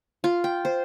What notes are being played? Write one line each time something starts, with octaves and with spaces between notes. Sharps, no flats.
F4
G5
C5